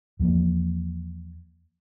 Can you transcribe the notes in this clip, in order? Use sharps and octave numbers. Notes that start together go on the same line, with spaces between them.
E2 F3 A#3